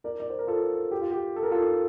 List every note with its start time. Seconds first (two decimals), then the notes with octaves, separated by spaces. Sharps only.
0.04 A#4 D5
0.20 D5
0.30 C5
0.39 A#4
0.47 F4 A4
0.91 G4
1.01 F4
1.11 G4
1.36 A4
1.43 A#4
1.51 F4 A4